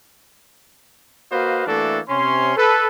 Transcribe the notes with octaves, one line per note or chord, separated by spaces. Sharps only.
A#3 F#4 B4 C5 D#5 F5
E3 A3 A#3 D4 F#4 A4
C3 C#4 C6
A4 B4